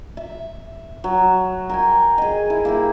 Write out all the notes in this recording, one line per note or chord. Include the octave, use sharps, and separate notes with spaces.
E5
F#3
A#4 G5 G#5
G#4 D#5
E4
A#3 E4 G4